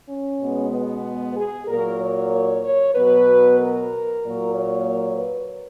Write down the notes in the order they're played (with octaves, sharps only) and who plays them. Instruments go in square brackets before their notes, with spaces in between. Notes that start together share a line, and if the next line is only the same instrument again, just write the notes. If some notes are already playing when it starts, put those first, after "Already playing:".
[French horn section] C#4
B2 G#3 B3
B3
G#4
A#2 F#3 A#3 A#4
C#5
C#5
B2 F#3 B3 B4
A#4
A#2 F#3 A#3
C#5
B4